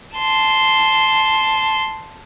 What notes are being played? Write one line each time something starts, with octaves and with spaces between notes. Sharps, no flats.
A5 C6